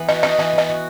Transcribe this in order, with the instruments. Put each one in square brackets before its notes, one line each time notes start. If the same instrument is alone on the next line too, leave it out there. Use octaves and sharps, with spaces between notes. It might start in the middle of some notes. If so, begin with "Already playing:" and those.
Already playing: [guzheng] E3 B3
[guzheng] F#4 [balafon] D#5
[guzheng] D#4 [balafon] D#5
[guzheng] E3 [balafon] D#5
[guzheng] B3
[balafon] D#5
[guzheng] F#4